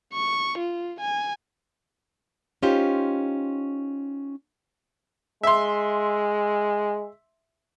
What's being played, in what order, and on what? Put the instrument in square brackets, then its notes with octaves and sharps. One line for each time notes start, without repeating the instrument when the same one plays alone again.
[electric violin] C#6
F4
G#5
[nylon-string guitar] C#4 D#4 F4 G4 C5
[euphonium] G#3 [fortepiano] E5 C6